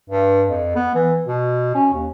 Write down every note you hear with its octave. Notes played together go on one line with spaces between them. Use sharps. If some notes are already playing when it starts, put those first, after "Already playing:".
G2
F2
B3
E3
B2
C#4
D#2